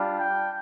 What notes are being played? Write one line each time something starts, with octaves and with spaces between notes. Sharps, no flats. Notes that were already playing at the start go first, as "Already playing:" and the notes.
Already playing: G3 D4 F4
G5